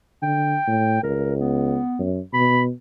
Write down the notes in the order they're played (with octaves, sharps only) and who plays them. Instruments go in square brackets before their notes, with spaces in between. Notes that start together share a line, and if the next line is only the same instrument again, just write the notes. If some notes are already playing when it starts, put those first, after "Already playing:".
[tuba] D3 [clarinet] G5
[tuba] A2
[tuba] C#2 [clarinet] A#4
[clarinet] B3
[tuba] F#2
[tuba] B2 [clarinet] B5